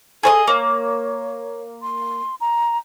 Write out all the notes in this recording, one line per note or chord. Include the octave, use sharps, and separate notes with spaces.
G#4 A4 C5 D#5
A#3 C#5
C6
A#5